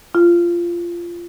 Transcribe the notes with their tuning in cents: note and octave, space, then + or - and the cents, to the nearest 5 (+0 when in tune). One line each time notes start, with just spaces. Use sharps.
F4 -15